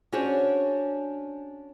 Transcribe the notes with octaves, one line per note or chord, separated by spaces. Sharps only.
C#4 D4 F#4 G#4 C5 C#5